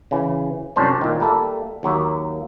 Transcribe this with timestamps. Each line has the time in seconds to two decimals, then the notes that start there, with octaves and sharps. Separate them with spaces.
0.11 C#3 E3
0.76 C2 F#2 C#4 D4 C5 D5
1.01 A#2 D#3
1.20 G3 A#3 A4 E5
1.83 D#2 F#3 A#3 E5